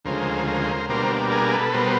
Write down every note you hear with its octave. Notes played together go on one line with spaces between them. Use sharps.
D2 C#3 F3 G#3 A#4 C5
A#4 C5
B2 G3 A#3 D4 A#4 C5
G#4 A#4
A4 B4
B2 G3 B3 A#4 C5